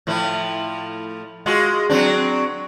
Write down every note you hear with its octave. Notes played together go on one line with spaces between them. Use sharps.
A2 F3 E4
G#3 F4 F#4
F#3 C4 D4